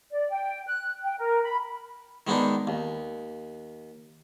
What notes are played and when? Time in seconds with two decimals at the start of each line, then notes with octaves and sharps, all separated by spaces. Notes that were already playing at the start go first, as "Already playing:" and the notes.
0.12 D5
0.29 G5
0.67 F#6
1.03 G5
1.19 A#4
1.43 B5
2.27 D#3 G#3 B3 D4 D#4
2.67 D#2